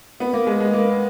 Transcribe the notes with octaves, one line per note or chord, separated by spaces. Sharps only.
B3
A#3
G#3
G#3
A#3